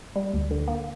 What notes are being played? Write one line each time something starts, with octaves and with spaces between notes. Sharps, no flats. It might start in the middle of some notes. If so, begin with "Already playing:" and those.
G3
D2
D3
A#3